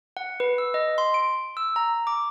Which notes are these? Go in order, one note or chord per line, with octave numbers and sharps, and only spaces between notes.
F#5
B4
E6
D#5
C6
D7
E6
A#5
D6